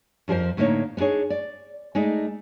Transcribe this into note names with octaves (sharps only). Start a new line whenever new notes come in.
F2 F3 G#4 A#4 C5
A2 D3 A#3 C#4 D#4 C#5
B3 D4 D#4 G#4 C#5
D5
G#3 A3 D#4 D5